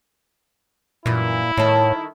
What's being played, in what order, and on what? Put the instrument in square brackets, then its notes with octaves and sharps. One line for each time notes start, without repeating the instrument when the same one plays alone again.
[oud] F#2 E3 [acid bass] A#2 [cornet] E4
[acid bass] A2 [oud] D#3 A4 [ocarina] C#5